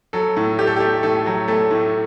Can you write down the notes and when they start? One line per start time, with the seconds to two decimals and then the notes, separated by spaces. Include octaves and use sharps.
0.13 F#3 A4
0.37 A2
0.59 A3 G4
0.67 A4
0.76 G4
0.80 A3
1.03 A2 A4
1.26 F#3
1.48 A3 A4
1.71 A2